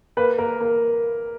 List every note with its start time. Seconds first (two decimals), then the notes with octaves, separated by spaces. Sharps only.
0.17 A#3 B4
0.38 A#3 A#4
0.60 A#3